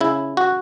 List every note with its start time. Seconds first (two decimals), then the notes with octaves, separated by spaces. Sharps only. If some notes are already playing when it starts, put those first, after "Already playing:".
0.01 C#3 E4
0.37 F#4